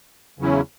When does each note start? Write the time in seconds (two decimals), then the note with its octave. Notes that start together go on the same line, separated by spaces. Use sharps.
0.39 E2 C#3 F#3 C#4 E4